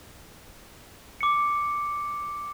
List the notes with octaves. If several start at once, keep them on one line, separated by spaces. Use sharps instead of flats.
D6 C#7